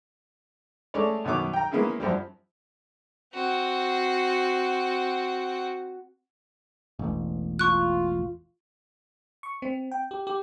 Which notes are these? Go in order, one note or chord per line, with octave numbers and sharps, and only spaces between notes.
G#3 A3 C#4 C#5 D5
F#2 B2 D#3 C#5 D6
G5 A#5
G#3 A#3 B3 C#4 E4 G#4
F#2 F3 G3
C4 F#4
E1 A1
F4 C#6 F#6
C#6
C4
G5
G4
G4